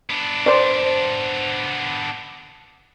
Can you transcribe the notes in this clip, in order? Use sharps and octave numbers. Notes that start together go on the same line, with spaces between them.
B3 D4
C5 D5